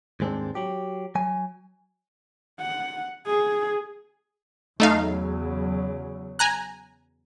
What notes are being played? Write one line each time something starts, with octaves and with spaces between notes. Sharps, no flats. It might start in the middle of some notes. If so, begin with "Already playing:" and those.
D#2 G#2 G#3 C4 D4
F#3 G4
F#3 G#5
F#5
G#4
E2 C#3 F#3 A3 D#4 F5
G#5 A#5 F#6